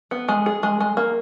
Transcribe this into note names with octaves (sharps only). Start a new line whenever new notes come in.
B3
G#3
G#4
G#3
G#3
A#3